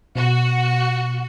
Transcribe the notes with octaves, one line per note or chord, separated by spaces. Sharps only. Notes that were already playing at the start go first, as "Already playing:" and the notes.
B2 F#4